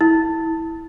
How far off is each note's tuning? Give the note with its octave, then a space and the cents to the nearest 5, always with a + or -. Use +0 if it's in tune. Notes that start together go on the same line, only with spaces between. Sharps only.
E4 -20